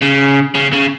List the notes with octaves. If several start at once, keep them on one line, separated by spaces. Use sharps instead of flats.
C#3
C#3
C#3